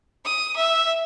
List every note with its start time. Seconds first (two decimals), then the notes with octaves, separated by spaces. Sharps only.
0.25 D#6
0.56 E5